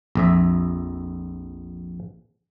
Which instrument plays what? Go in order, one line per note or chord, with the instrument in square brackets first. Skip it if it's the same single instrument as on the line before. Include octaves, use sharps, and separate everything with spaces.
[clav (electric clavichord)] A#1 F2 E5